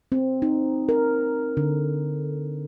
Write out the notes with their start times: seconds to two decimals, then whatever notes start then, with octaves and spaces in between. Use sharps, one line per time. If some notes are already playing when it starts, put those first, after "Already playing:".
0.12 C4
0.42 D#4
0.89 A#4
1.57 D3